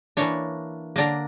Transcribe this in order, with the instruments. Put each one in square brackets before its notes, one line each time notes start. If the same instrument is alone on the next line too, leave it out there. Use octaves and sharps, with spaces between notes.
[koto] E3 A#3 D4 C#5
D3 A#3 D4 A#5